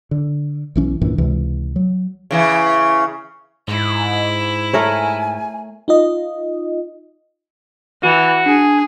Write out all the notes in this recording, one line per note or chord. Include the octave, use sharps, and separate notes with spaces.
D3
B1 E3 C#4
C2 G2 A#2 E3
C#2 C3 E3
F#3
C#3 E3
G#2 E4
A3 A#4 C#5 G#5
D#4 F4 D#5
E3 F#4
D4 G#4